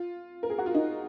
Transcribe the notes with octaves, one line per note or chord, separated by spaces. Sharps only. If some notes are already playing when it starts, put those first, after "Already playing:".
Already playing: F4
A#4
G#4
F#4
F4
D#4